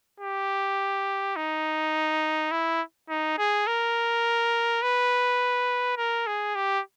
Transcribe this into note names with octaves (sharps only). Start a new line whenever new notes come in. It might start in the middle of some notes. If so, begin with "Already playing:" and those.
G4
D#4
E4
D#4
G#4
A#4
B4
A#4
G#4
G4